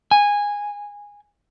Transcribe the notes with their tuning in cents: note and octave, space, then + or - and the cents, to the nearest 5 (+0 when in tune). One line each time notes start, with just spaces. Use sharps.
G#5 -15